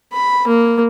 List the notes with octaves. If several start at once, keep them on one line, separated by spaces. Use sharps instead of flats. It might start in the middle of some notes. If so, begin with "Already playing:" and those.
B5
A#3